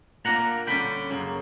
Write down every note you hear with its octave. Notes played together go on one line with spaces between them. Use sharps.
A#2 A#3 D4 F#5 A#5
D3 G3 C#4 G5 B5
F#2 C#3 F#3 A#3